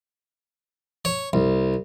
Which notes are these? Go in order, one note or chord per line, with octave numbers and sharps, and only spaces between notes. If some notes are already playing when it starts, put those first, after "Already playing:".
C#5
C2